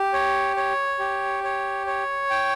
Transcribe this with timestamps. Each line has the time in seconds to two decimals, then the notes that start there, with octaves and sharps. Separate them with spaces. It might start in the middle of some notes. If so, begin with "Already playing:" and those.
Already playing: G4
0.13 C#5
0.57 C#5
0.99 G4
1.44 C#5
1.87 C#5
2.30 G5